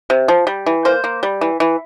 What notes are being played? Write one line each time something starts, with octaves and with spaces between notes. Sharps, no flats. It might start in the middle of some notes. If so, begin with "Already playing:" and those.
C3
F3
G3
E3
A#3 C5
A#3
G3
E3
E3